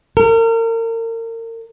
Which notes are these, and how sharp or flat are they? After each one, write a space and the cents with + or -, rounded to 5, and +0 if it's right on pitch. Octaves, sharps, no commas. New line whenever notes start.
A#4 -35